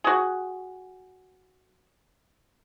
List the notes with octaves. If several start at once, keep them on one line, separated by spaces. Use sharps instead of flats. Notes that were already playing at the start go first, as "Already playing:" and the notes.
F#4 G#4